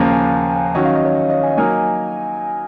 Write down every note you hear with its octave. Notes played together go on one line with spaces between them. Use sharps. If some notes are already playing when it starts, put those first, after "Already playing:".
Already playing: D#2 C#3 F3 A#3 A#5
G#5
D#3 F#3 C#4 F#4 D#5
F5
D#5
C#5
D#5
G#5
F#3 A#3 D#4 A#4 G#5